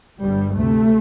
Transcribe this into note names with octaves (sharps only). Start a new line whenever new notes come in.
G1 G2 G3
D2 C3 A3